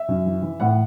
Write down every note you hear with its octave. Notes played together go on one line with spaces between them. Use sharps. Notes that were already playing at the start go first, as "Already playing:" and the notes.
Already playing: E5
F#2
E3
E3
A2 F#5